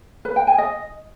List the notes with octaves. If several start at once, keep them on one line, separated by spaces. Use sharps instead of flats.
B4
G5
G#5
D#5